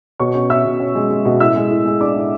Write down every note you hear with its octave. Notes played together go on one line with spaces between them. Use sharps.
B2 C#5 C#6
C#4
C#4 E5 E6
B2
C#4
G#3
G#3
B2
A2 E5 E6
G#3
A2
G#3
D4 D5 D6
A2